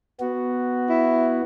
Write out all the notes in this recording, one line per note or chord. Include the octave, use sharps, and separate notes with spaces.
B3 F#4
E4